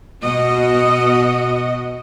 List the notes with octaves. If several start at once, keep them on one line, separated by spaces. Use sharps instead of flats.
B2 F#4 D#5